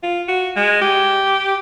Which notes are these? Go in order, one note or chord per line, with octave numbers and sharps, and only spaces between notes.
F4
F#4
G#3
G4